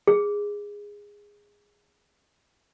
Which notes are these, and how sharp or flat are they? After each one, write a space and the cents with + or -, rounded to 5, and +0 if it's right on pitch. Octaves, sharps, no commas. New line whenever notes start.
G#4 -15